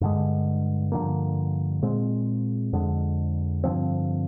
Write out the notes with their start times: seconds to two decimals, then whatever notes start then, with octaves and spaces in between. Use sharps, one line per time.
0.01 G2 D3 G#3
0.92 G2 D3 F3 A#3
1.82 A#2 G#3 C4
2.73 F2 D3 G#3
3.64 G2 D3 F3 C4